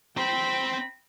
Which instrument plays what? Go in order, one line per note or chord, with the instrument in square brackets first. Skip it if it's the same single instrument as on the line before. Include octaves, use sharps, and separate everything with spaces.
[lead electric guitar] C4 C5 [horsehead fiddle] G5 B5